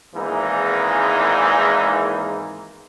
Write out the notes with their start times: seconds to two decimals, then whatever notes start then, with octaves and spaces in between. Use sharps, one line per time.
0.15 G#1 E2 G#2 E3 A#3 D#4